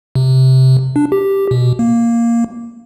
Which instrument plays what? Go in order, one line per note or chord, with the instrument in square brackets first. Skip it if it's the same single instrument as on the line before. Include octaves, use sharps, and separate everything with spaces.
[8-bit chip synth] C3
D4
G4
B2
A#3